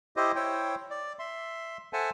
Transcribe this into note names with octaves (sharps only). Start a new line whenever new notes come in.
E4 G4 C5 D#5
E4 C5 C#5 G5
D5
E5 C6
A4 C5 E5 F#5 G#5 A5